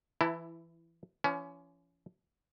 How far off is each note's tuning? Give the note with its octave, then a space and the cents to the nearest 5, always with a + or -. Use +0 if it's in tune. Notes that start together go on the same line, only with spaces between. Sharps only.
E3 +15 E4 +0 A5 +30
F3 -45 C#4 +20